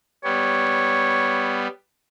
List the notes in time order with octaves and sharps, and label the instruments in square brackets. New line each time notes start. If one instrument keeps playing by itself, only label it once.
[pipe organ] G3 B3 [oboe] C#5